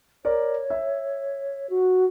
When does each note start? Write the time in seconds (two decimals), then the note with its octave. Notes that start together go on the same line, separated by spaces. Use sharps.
0.25 A#4 C#5 D5
0.70 E5
1.70 F#4